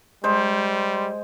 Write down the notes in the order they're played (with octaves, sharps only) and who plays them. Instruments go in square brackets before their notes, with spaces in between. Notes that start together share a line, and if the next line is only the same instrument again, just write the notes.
[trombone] G3 [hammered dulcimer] G#3 C5